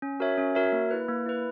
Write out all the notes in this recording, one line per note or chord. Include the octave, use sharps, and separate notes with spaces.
C#4
F#4 A#4 C#5 E5
C#4
F#4 A#4 C#5 E5
A#3
E4 B4
A#3
E4 B4